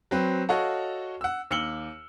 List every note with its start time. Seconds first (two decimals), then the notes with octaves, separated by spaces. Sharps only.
0.11 F#3 C4 B4
0.49 F#4 A4 C#5 D#5 F5 F#5
1.21 F#5 E6
1.51 D#2 E6 F6 C#7 F#7 G7